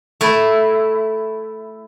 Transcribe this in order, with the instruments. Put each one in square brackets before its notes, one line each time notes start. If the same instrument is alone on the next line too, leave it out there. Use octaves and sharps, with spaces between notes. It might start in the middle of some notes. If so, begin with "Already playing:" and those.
[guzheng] A3 E4